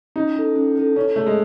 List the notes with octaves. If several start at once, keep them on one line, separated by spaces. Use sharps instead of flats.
C#4 D#4
E4 A4
C#4
E4 A4
C#4 D#4
A3 G#4 C#5
G#3